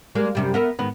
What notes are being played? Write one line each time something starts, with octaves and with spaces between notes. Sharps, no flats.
G3 G#3 A#3
F#2 C3 G3
B3 A#4 E5
G#2 D#3 B3